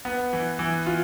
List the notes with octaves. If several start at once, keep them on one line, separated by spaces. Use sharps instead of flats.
B3
E3
E3
F4